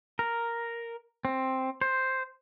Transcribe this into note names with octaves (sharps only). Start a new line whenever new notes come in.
A#4
C4
C5